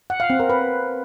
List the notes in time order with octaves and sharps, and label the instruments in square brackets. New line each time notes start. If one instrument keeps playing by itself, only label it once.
[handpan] F#5
F5
C4
A#4
B4